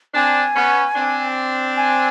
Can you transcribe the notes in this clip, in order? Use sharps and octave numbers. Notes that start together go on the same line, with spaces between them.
C4 D4 G#5
B3 C#4
C4 D4
G#5